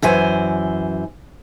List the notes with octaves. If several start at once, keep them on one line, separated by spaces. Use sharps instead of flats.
F#2 E3 C5 G#5